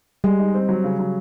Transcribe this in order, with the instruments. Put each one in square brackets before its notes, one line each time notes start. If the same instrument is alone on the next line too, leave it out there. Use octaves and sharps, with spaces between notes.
[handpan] G3 [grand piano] G#3
[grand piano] D#4
C4
F#3
C#3
F#3